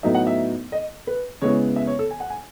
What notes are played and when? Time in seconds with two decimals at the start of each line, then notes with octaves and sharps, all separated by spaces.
0.03 A2 F#3 B3 D#4 E5
0.15 F#5
0.27 E5
0.72 D#5
1.07 B4
1.42 C#3 G#3 B3 E4 C#5
1.76 E5
1.87 C#5
1.99 A4
2.11 G#5
2.20 F#5
2.30 G#5